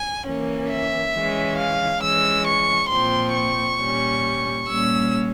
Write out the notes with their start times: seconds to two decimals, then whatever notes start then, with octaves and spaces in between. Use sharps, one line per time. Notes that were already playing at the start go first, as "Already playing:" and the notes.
Already playing: G#5
0.27 E3 A#3 C#4
0.71 E5
1.15 E3 G#3 C#4
1.58 F5
2.02 E3 G#3 C#4 E6
2.47 C#6
2.91 A#2 F3 C4 C6
3.35 C#6
3.79 A#2 G3 C#4
4.67 A#2 G3 A#3 C#4 E6